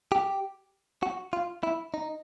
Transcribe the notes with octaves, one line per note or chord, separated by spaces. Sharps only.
G4
F#4
F4
E4
D#4